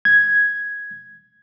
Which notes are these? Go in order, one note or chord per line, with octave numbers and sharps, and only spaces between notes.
G#6